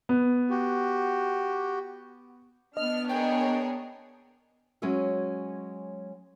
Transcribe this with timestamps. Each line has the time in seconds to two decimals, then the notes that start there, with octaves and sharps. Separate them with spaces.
0.09 B3
0.50 F#4 G4
2.77 B3 D4 D#5 F6
3.09 G#4 A#4 C#5 G5
4.82 F#3 G#3 C#4 C#5 E5